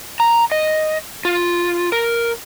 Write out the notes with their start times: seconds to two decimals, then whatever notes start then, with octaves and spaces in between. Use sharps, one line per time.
0.20 A#5
0.52 D#5
1.25 F4
1.92 A#4